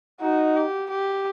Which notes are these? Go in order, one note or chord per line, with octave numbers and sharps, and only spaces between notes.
D#4 F#4
G4
G4